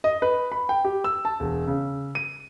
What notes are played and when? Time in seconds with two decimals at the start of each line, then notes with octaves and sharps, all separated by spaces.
0.04 D#5
0.22 B4
0.52 B5
0.69 G5
0.85 G4
1.04 E6
1.25 A5
1.40 E1
1.67 C#3
2.15 D#7